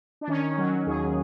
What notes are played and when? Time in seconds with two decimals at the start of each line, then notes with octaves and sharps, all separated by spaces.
0.21 D4
0.28 D#3 C#4
0.58 F#3
0.86 D#2 G#4